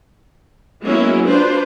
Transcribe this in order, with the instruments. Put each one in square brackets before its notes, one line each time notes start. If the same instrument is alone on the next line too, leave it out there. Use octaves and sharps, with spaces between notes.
[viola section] F#3 G#3 A#3 B3 C#4 E4
D4 F4 B4 C5